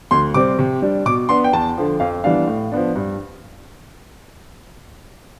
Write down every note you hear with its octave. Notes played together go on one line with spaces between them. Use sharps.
D2 C6
C3 G3 C4 D6
C3
G3 D4
B2 D6
B3 D4 C6
G5
E2 A5
D3 F3
F2 F5
E3 G3 B3 D4 F5
A2
F3 B3 D4
G2